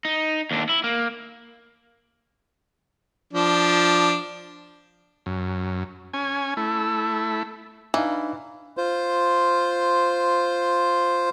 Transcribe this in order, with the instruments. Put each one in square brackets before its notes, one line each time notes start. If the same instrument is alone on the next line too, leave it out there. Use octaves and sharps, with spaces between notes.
[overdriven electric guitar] D#4
D#2 D4
E4
A#3
[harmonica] F3 D4
[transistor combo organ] F#2
C#4 G#5
A3 E4
[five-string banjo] E3 [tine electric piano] D4 D#4 F5
[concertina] F4 C5